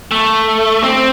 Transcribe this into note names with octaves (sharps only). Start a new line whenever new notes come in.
A3
C4